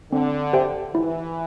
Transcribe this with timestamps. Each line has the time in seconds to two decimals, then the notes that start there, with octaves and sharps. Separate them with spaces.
0.12 D3 C4
0.53 G4 C5 E5 G5
0.95 E3 E4